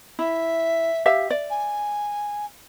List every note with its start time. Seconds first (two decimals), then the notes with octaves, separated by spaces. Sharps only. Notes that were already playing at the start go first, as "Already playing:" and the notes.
0.19 E4 E5
1.06 G4 E5 F5
1.30 D5
1.50 G#5